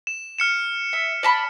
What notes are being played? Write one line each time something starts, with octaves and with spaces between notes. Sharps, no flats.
E7
F6 C#7 E7
E5
D5 A5 B5